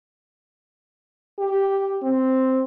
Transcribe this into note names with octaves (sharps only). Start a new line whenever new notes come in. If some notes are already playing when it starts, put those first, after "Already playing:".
G4
C4